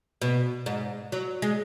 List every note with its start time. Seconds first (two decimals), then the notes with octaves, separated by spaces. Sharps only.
0.22 B2
0.66 G#2
1.12 F#3
1.42 G#3